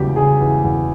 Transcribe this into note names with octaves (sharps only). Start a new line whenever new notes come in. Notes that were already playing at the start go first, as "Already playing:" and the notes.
Already playing: E2 C#3 F#3 G4
C#3 G#4
E2
E2